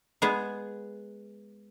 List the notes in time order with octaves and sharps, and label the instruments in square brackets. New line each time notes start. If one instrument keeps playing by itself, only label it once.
[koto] G#3 B3 G#4